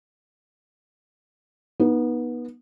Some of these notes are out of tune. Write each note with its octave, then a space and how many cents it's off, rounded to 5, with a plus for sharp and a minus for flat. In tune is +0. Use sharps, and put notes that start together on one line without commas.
B3 -25 D#4 +0